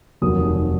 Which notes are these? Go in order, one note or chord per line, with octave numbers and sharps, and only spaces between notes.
F1 D#2 D#3 F#3 D#6